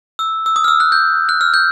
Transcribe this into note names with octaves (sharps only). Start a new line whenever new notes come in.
E6
E6
D#6
F6
E6
F#6
G6
F#6
F6
G6